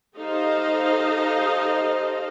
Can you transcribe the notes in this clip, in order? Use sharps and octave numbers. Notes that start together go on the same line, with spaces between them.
D#4 G4 A4 C5 D#5 F5